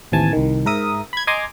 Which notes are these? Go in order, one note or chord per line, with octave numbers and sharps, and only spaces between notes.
A1 D#2 C3 E3 G#5 A5
C2 D#3
G#2 A#4 E5 D#6
B5 G#6
D#5 G#5 A#5 C6 D6 D#6